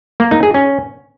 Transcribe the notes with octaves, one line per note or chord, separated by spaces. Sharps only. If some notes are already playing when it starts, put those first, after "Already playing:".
A#3
D#4
G#4
C#4